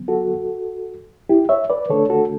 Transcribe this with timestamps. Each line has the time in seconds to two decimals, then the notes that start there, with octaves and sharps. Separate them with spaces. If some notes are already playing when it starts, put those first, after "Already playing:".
Already playing: D3 F#3 B3
0.08 F#4 A4
1.29 E4 G4
1.49 C#5 E5
1.70 B4 D5
1.89 D3 A3 D4 A4 C#5
2.10 F#4 A4